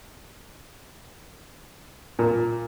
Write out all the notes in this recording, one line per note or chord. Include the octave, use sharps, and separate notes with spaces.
A#2